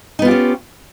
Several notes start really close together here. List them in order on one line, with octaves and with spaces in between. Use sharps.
D#4 B3 F4 G4 C#4